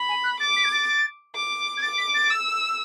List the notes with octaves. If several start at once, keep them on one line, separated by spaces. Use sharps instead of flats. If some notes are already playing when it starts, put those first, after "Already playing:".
Already playing: B5
G#5
F#6
D6 A6
B6
G#6
A6
D6
G#6
D6 A6
B6
A6
E6